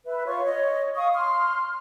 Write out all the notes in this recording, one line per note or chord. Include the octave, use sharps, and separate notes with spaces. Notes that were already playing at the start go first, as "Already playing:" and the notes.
B4 E5
F4 C#5 C#6
C#5 D#5
F5 C#6 D#6
C6 F6